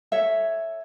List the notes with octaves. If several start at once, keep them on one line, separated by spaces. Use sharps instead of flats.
A4 C#5 E5